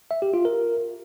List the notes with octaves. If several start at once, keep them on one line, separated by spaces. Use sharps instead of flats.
E5
G4
F4
A#4